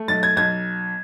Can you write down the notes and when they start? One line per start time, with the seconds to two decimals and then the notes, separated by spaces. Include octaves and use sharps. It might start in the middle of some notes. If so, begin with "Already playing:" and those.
Already playing: A3
0.08 B1 A6
0.23 G#6
0.36 B1 G#6